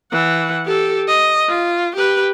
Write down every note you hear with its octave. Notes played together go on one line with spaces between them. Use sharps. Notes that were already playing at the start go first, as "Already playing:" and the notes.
E3 F#5
G4 A4
D#5
F4
G4 B4